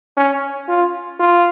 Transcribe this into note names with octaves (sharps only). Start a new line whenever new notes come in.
C#4
F4
F4